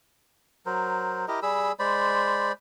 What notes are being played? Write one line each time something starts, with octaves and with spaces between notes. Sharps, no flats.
F#3 A#4 C5
E4 G4 A#4 D#5
G3 G#4 B5 E6
G#3 C5 D5 B5